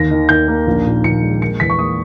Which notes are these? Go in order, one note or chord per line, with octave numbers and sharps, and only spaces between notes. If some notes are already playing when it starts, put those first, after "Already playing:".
Already playing: D#2 A#6
D#3
D#2 G6
A#3
A#1
A#2
A#1 C#7
G#3
A#3 C#7
E2 B6
C#6
A#3 D#6